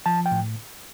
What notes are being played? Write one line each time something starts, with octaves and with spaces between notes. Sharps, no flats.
F3 A5
G5
A2